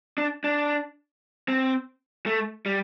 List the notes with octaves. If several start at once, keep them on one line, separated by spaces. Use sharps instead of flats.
D4
D4
C4
A3
G3